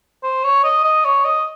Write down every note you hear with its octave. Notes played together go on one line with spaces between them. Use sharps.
C5
C#5
D#5
D#5
C#5
D#5